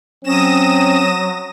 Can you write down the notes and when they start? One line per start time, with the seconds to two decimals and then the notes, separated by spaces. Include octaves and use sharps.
0.24 F#3 C4 C#4 D#6 A#6 E7